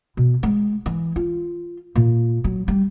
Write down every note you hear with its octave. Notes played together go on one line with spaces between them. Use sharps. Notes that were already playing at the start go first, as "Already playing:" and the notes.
B2
G#3
E3
F4
A#2
F#3
G3